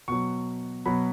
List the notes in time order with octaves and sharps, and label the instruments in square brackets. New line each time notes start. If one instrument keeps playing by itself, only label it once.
[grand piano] B2 F#3 C#6
B2 F#3 B5